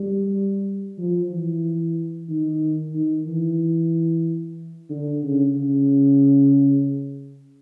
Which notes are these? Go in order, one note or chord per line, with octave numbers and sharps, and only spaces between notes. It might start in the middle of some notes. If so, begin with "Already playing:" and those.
Already playing: G3
F3
E3
D#3
D#3
E3
D3
C#3
C#3